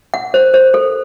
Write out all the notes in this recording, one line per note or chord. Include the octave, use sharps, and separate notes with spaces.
F#5
C5
C5
A4